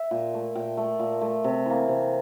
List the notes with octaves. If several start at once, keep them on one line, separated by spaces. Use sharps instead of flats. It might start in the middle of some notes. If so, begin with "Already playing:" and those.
Already playing: E5
A#2
A3
A#2 G5
A3
A#2
A3
C3
E3 A#3
C3